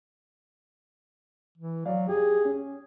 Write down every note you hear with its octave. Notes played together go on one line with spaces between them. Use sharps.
E3
F#3 D5 F5
G4 G#4
C#4